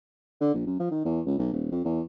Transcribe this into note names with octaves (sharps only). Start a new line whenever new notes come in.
D3
A#1
F#2
F3
D#3
E2
C#2
B1
D#1
F2
E2